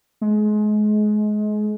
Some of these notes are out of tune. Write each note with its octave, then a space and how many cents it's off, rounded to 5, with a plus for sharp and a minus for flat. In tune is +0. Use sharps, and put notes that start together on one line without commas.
G#3 +30